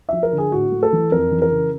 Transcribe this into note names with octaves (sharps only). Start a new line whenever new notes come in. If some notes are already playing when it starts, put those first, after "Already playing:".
F3 E5
A#4
D3
G#4
A2 F#4
A3
A4
E3
F2 A#4
E3
A#4
C#3